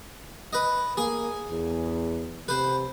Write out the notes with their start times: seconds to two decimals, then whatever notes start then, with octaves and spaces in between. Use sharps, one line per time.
0.53 B4 D#5
0.97 A#3 G#4 G#5
1.51 E2
2.48 C3 B4 C5